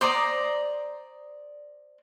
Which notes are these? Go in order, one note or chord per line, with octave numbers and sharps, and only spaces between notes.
C5 D5 A#5 D#6